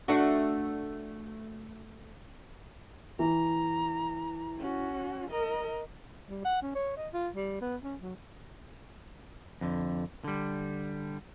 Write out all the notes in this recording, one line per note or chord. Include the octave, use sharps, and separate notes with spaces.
A3 D4 F#4
E3 A#5
C#4 F#4
A#4 D#5
G3
F#5
C#4
C#5
D#5
F4
G3
B3
C#4
F#3
F2 D3
D3 G3